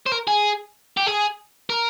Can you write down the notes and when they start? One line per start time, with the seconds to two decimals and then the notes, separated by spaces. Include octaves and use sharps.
0.06 C5
0.12 A#4
0.27 G#4
0.97 G4
1.06 G#4
1.70 A#4